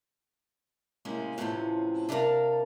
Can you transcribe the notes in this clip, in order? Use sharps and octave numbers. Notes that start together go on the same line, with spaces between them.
A2 C3 G#3 A#3 C#4 G#4
F2 A2 C3 E3 C4 C#4
C3 D4 A4 A#4 F5